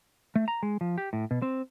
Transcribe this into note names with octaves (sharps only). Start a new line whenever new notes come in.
A3
A#5
G#3
F3
G4
A2
B2
C4